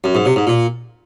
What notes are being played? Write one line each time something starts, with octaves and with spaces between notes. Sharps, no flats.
F#2
G#2
C3
G#2
A#2